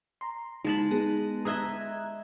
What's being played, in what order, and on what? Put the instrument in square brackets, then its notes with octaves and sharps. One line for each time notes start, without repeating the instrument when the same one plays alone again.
[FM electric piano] A#5 C6
[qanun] G#3 A5 B5 [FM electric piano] D#4
[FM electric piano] B3 D#4 G#4
[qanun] G#4 D#5 E5 [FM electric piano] A#5 F#6 G#6